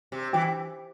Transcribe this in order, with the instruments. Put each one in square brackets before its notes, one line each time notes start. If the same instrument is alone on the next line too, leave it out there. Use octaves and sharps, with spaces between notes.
[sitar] C3
[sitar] E3 [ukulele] G4